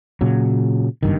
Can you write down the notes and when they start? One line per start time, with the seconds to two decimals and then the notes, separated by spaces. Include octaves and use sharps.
0.21 A#2 C#3 F#3
1.03 F#1 B1 G2 D#3